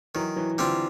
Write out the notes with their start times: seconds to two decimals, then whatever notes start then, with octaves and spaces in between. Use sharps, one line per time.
0.15 D#3 E3 F#3
0.36 E3 F#3
0.58 D3 E3 G3 C4 F4